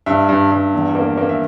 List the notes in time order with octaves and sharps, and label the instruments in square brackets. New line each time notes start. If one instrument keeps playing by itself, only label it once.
[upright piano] G2 E5
G2
G2
E2
A#3
A#3
E5